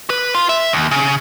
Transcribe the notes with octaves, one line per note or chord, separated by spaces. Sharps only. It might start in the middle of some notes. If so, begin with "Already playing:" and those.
B4
F4
E5
D#2
C#3